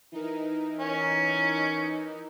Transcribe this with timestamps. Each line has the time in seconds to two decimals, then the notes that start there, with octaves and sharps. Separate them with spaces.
0.12 E3 D#4 A#4
0.80 C#4